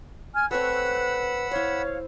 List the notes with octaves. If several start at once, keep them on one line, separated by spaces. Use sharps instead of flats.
G#5 F6 G#6
A3 C4 B4 C#5 F#5 B5 E6 F#6
E4 C5 C#5 F5